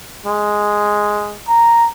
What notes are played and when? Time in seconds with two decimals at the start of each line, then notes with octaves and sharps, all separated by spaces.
0.26 G#3
1.48 A#5